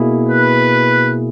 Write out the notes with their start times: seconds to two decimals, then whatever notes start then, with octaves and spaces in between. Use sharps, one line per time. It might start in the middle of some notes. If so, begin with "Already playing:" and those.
Already playing: B2 A#3 E4 G#4
0.28 B4